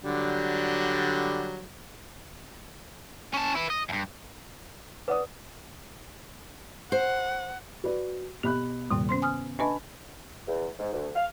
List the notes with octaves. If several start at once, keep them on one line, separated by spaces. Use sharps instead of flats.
D3 F#3 G3
C#4 A5
E4 B4
D#5
E2 G2
B4 D5 F#5 D#6
C5 F#5
F#4 B4 D5
B2 G4 B5 F#6
D#1 G2 C3 D#3
B3 C#4 C5 C6
G#5 D#6 F6
D4 B4 D#5 G#5 A5 B5
E2
G#2
D2
F5